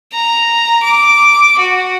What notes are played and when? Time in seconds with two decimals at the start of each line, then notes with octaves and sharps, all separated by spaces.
0.13 A#5
0.83 D6
1.58 F#4